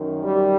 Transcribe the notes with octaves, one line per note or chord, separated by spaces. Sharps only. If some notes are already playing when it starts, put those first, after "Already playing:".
Already playing: F#2 D#3
G3